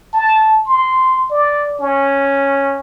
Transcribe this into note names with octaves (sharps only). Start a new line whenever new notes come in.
A5
C6
D5
C#4